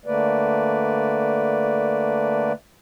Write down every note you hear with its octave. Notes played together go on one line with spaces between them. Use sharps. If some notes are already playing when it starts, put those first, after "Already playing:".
D3 A3 A#3 B4 D5